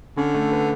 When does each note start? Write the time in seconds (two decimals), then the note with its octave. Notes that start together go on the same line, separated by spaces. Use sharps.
0.17 D3 C#4
0.34 A3
0.52 B4